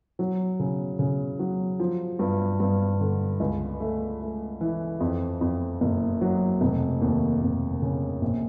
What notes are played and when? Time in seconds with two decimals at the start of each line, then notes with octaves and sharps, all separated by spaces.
0.19 F#3
0.59 C#3
0.99 C#3
1.39 F#3
1.80 F3
2.19 G2
2.60 G2
3.00 D3
3.40 C#2
3.80 A3
4.21 A3
4.61 E3
5.00 F2
5.41 F2
5.81 F#1
6.21 F#3
6.61 F1
7.01 D#2
7.42 F1
7.82 C#3
8.21 A#1